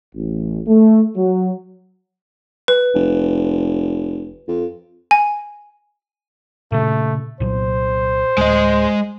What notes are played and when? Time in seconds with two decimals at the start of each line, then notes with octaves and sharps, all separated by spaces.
0.14 A1
0.67 A3
1.16 F#3
2.68 B4
2.94 F1
4.48 F2
5.11 G#5
6.72 A#2 C#3 A3
7.40 C2 A#2 F#3 C5
8.38 D1 G#3 D#5